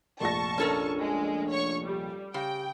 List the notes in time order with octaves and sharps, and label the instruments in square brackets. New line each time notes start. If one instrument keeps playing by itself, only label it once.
[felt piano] F1 A#1 A#6 [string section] A5 C#6
[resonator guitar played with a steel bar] C#4 A4 A#4 [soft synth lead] D4
[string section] G#3
C#5 C#6
G3
[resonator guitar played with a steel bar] C#3 [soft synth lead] G4 [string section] G5